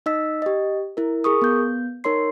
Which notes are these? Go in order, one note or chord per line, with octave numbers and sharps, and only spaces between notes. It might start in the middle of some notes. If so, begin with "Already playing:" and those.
D#4 D#5 E6 B6
G4 D#5
E4 A#4
G#4 A#4 C#6 D#6
B3 G6
D#4 A#4 C#5 C6 C7